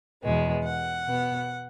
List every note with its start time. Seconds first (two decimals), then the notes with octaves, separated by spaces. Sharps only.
0.22 E2 B2 G#3 B3
0.64 F#5
1.06 B2 B3